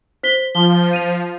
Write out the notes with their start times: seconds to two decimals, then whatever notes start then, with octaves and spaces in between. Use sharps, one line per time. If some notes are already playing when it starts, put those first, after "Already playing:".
0.23 C5 B6 G7
0.55 F3 G7
0.93 D#7 F7